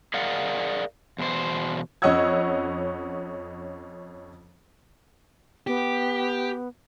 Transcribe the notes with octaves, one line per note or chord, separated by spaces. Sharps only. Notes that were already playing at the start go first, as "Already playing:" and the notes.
G#4 A#4 D5 F5 F#5
E2 B2 C5
F2 C#4 D#5 F#5 E6 G#6
B3 G4